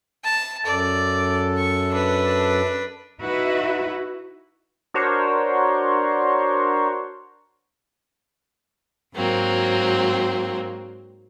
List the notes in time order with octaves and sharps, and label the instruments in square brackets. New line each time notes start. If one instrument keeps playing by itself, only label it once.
[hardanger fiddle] A5
[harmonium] F#2 A4 [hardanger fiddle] D5
[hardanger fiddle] C#6
D4 B4
[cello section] D#4 E4 F#4 B4 E5
[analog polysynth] D4 F#4 A#4 C5 C#5
[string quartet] G#2 F#3 A#3 C4